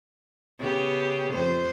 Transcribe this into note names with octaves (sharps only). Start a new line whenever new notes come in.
C#3 B3 G4
F2 C5